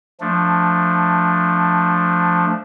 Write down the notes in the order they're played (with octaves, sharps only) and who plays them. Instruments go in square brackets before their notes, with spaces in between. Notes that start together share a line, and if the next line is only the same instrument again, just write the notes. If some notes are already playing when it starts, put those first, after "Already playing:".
[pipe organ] F3 A3 D4